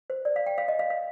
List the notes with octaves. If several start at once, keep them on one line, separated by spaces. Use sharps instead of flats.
C5
D5
F5
G5
F5
D#5
F5
F5